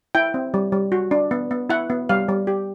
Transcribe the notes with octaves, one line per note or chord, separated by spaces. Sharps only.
E4 G5
C4
G3
G3
F#4
D4
B3
B3
E4 F#5
B3
G3 F5
G3
G4